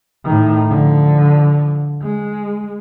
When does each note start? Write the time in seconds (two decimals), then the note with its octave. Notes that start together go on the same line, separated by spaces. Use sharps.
0.25 A2 D#3
0.70 D3 F3
2.02 G#3